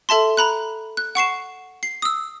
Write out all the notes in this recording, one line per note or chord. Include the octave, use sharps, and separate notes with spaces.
A4 E5 A5 C6
A#5 B5 F#6
F#6
F#5 C#6 C7 E7
C7
D#6 E6